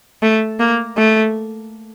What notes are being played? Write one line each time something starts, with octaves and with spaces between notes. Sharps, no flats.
A3
A#3
A3